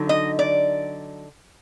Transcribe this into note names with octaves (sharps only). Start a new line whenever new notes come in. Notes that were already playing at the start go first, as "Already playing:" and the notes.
Already playing: D3 F#3 D#4
D#5
D5